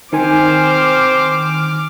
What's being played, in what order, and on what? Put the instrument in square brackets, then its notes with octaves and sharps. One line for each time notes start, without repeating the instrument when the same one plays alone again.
[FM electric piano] D#3 G#5 [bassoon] C4 [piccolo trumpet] C5 [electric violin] D6 F6